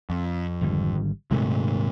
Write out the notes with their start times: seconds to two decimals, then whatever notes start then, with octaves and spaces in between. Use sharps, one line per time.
0.10 F2
0.61 G#1 D3 G3
1.31 D#1 G#2 C3 G#3 A3